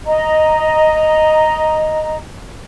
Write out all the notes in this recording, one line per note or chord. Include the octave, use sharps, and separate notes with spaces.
D#5 A#5